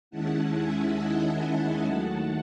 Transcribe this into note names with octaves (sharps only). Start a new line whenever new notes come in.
D#2 D#3 G#3 C#4 E4 F#5 A5
E5 G#5
D#5 F#5
E5 G#5
D#2 D#3 F#3 A3 F#5 A5